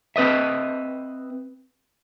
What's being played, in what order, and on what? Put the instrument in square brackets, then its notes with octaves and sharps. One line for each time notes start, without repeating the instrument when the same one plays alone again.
[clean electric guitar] C4 B4 D#5 E5